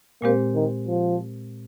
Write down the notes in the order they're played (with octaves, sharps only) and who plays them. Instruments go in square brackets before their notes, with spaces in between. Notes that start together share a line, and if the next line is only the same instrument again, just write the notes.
[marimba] A#2 G#3 C4 G4 C5 [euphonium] A#3
[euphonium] D#3
F3